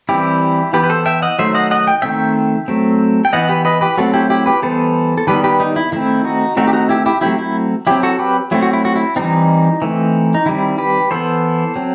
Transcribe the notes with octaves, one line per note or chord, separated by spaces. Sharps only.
E3 G3 C4 E4 G4
E3 B3 G4 B4
B4
A4 C5
E5 G5
D#5 F#5
D#3 F#3 A3 C5 E5
D#5 F#5
D#5 F#5
G5
D#3 A3 C4 E5 G5
F#3 A3 C4
G5
E3 B3 D#5 F#5
G4 B4
B4 D#5
G4 B4
F#3 A3 C4 F#4 A4
E4 G4
E4 G4
G4 B4
E3 G3 B3 A4 C5
A4
D#3 G3 B3 G4 B4
G4 B4
D#4
E4
D#3 A3 C4 E4
D#4 F#4
D#3 A3 C4 D#4 F#4
G4
D#4 F#4
E4 G4
E4 G4
F#3 A3 C4 E4 G4
E4
F#3 C4 E4 G4
F#4 A4
G4 B4
F#3 A3 C4 E4
F#4
E4
F#4
E4
E3 G3 C4 D#4
E3 A3 C4
D#4
D#3 G3 C4 E4
G4 B4
E3 B3 A4 C5
F#3 C4